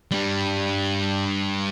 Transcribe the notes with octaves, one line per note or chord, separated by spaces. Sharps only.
G2 G3